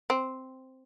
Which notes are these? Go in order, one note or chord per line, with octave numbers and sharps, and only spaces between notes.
C4